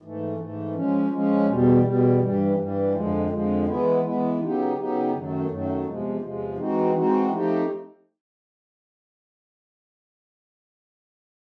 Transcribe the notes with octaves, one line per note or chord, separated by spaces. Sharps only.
G#2 E3 A3
G#2 E3 A3
F3 G#3 C#4
F3 G#3 C#4
E2 B2 G3
E2 B2 G3
G2 E3 G3
G2 E3 G3
F2 D3 F3 G#3
F2 D3 F3 G#3
E3 G#3 B3 E4
E3 G#3 B3 E4
C#3 F#3 B3 D#4 G4
C#3 F#3 B3 D#4 G4
F#2 D#3 F#3 A3
F#2 D#3 F#3 A3
E2 C3 F3 G#3
E2 C3 F3 G#3
E3 G#3 C4 D#4 F#4
E3 G#3 C4 D#4 F#4
F3 A3 C4 D#4 G4